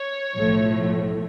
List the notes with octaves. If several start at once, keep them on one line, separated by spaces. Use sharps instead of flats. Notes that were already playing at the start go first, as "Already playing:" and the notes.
Already playing: C#5
B1 A2 F3 A3